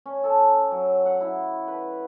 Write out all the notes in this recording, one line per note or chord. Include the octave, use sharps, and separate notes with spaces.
C#4
A4
A#5
F#3
F#5
E4
B4